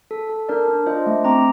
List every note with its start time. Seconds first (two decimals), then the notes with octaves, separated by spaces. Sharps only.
0.11 A4
0.29 A4
0.49 D4 A#4 D5
0.68 D4
0.86 F4 C5 D#5
1.06 A3
1.24 C4 A#5 D6